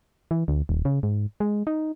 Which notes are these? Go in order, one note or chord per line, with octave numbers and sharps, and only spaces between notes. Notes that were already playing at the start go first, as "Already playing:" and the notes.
E3
D2
D#1
C#3
G#2
G#3
D#4